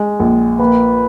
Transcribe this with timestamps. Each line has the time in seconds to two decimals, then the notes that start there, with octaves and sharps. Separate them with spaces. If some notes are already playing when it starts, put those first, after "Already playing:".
Already playing: G#3
0.20 A#1
0.60 A#3 B4